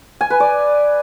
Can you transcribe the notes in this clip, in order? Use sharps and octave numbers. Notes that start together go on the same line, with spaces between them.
G#5
B4
D5